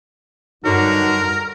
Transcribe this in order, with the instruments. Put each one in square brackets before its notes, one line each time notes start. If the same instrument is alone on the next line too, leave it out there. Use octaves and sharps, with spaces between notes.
[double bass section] G2 [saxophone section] D3 F#3 F#4 [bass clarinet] D#4 [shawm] A#4